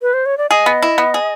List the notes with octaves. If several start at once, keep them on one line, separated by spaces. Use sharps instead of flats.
B4
C5
C#5
D5
G#4 D#5
B3
E4
B3
G#4